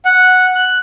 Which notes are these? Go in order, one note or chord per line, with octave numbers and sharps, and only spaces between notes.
F#5
F#6